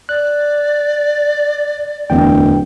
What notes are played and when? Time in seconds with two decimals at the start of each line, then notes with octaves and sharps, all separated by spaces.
0.09 D5 F#6
2.10 D1 E2 D3 G5